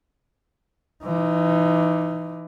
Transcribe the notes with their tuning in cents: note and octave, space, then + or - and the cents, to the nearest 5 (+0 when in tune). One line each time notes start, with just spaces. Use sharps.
E3 +30 D#4 +5